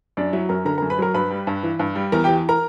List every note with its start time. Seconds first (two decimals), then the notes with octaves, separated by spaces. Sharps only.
0.17 F#2 D4 D5
0.33 F#3 E4 E5
0.49 F#2 A#4 A#5
0.65 D3 A#4 A#5
0.78 A#4 A#5
0.82 F#2
0.90 B4 B5
0.99 F#3 A#4 A#5
1.14 G2 B4 B5
1.31 G3
1.47 G2
1.63 E3
1.79 G2
1.95 G3
2.12 E2 A#4 A#5
2.24 E3 G4 G5
2.49 A#4 A#5